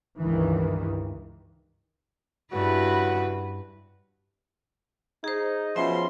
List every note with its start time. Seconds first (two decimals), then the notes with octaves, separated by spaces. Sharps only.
0.17 C#2 G2 D#3 E3
2.52 G2 C#3 E4 F#4 B4
5.24 D#4 G#4 C5
5.76 B2 F3 C#4 E5 C6